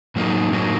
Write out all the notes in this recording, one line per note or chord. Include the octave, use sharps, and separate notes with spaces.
A2 F#3 A#3 D#4
A2 F#3 A#3 D#4